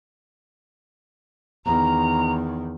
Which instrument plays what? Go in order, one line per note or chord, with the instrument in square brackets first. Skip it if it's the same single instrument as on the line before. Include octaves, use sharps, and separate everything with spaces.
[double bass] E2 D#3 [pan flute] A#5